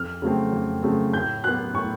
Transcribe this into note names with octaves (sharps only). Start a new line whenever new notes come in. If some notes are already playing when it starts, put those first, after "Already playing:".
Already playing: F2 F6
C#3 F#3 A3 C4
F2
C#3 F#3 A3 C4
A2 G6
F#3 B3 F#6
A2 C#6